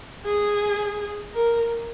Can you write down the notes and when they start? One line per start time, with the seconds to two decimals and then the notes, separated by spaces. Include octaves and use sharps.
0.26 G#4
1.34 A#4